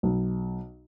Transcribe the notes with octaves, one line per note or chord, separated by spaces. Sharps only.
B1